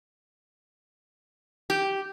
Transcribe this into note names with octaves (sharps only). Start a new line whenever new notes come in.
G4